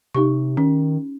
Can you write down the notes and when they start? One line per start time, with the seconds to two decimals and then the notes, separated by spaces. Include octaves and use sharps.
0.15 C3 D#4 G4 C#6
0.57 D#3 C#4